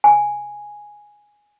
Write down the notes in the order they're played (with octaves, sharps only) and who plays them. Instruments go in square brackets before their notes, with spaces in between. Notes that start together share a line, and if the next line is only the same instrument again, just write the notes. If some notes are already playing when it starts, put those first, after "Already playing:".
[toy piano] G#5